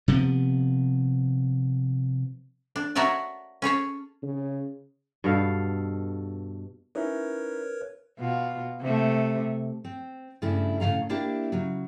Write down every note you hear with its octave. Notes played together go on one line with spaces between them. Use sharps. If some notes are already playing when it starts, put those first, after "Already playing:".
C3 F3 B3
D4
F#4 A#4 C#5 D5 E5 A5
C#4 G#4 C#5 A5
C#3
G2 B2 A4 F5
C#4 D#4 E4 A#4 B4 C#5
B2 F4
C3 A3
C4
G2 C#3 A3 D4 E4
A2 C#3 F#3 F5 A#5
A#3 D4 E4 G4
C#3 F#3